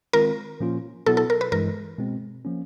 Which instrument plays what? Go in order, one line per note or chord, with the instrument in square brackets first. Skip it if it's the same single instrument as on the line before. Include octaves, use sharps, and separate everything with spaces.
[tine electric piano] D#3 G#3 C4 F4 [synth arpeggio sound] A#4
[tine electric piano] A#2 F3 A#3 C#4 F4
[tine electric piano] B2 F#3 B3 E4 [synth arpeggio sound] A4
[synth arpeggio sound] A4
A#4
B4
[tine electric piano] G2 E3 G#3 [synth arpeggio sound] A#4
[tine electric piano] B2 G#3 C4
F3 A#3 C#4